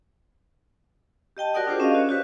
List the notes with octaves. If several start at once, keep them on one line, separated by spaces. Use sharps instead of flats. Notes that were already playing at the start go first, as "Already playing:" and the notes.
G4 D#5 G5 A5
F#4 A#4 D5 F#5 D#6
D4 F4 G4 G#4 A#4 C5
C#4 D#5 F5
F#4 C#5
F#4 G4 B4